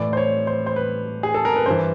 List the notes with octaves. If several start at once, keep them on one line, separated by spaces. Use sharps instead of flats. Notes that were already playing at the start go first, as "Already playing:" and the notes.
Already playing: A2 E3 D5
C5
C#5
C5
C5
B4
G#4
A4
A#4
B4
G2 E3 C5